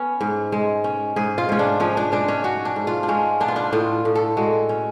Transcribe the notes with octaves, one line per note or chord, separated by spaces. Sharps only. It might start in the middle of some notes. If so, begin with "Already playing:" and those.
Already playing: B3 C#4
G#2
G#3
C#4
G#2 G#4
F4
G#2 C#4
D4
F3 C#4
D4
G#3 D4
C#4
C#4 F#4
D4
G#2
F4
D4
G#3 C#4
B3 D4
F4
D4
A2 F4
A2
A4
G#3 F#4
C#4